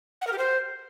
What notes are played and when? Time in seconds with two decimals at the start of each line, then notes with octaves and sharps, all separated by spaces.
0.21 F#5
0.27 A#4
0.33 G4
0.38 C5